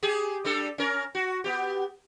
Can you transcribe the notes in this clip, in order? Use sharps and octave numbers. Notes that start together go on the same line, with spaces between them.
G4 G#4
G3 D4 A4
C#4 A#4
F#4
B3 G4